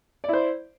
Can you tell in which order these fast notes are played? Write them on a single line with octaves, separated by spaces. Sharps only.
D5 E4 C5